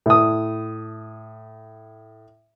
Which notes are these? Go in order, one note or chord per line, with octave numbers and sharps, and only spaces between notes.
A2 D#6